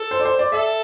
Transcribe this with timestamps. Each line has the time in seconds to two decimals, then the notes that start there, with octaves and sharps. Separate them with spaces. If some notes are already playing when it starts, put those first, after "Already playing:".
Already playing: A4
0.11 C5
0.20 D5
0.25 C5
0.39 D5
0.52 A4 E5